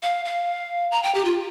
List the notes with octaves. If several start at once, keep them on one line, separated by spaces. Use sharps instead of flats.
F5
F5
A#5
G5
G4
F4